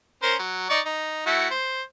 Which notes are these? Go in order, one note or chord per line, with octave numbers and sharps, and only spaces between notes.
C#4 A#4 C5
F#3
D#4 D5 C#6
D#4
A3 E4 F#4
C5